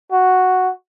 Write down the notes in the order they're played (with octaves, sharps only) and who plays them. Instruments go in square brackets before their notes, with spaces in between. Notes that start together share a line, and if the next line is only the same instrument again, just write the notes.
[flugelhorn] F#4